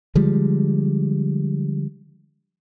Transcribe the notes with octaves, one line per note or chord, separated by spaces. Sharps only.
D3 F3 G3 G#3